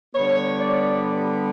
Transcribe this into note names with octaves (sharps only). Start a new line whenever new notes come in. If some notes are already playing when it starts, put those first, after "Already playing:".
D3 G3 B3 C#5
D5